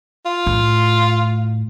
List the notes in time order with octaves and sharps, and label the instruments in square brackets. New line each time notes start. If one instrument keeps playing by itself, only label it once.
[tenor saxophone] F4
[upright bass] A2